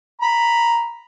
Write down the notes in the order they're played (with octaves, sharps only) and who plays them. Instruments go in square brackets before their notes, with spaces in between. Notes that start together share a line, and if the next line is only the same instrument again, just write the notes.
[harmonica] A#5 B5